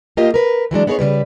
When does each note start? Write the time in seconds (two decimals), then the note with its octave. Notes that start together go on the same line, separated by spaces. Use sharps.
0.17 A#3 F4 G4 D#5
0.34 A#4 B4
0.71 E3 F#3 G#3 D4
0.87 B3 D#4 G#4 B4 C#5
0.99 C#3 G3 B4